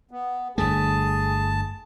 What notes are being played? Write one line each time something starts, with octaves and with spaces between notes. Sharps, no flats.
B3
G1 G2 A3 G#4 A5